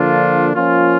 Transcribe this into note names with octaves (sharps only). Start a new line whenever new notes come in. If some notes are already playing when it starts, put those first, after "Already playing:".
Already playing: D3 F3 A#3 D4 F4
F3 A#3 C#4 F4